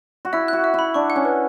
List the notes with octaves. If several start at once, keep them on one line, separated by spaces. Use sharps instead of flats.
F#4
E4 E5
F#4 F#6
E5
E4 B5
D4 C#6
F#5
C#4
B4